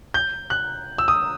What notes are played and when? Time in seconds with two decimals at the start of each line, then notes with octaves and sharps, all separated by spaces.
0.14 G6
0.50 F#6
0.98 E6
1.08 D#6